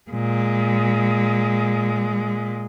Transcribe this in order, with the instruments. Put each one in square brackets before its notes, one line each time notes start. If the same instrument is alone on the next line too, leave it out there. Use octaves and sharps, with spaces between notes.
[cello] A#2 G#3